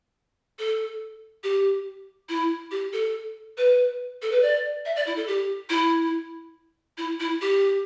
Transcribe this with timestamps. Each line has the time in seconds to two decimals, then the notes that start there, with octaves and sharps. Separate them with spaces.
0.59 A4
1.43 G4
2.29 E4
2.71 G4
2.93 A4
3.57 B4
4.22 A4
4.31 B4
4.42 D5
4.85 E5
4.96 D5
5.07 E4
5.16 A4
5.27 G4
5.69 E4
6.97 E4
7.20 E4
7.41 G4